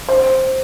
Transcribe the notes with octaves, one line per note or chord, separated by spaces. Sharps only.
C5